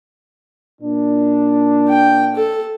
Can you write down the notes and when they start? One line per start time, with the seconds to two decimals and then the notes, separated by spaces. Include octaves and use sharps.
0.82 A#2 D4
1.89 G5
2.35 A4